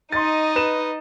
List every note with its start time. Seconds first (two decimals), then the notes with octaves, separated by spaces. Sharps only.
0.12 D#4 D#5 C6 A6
0.56 B4 E7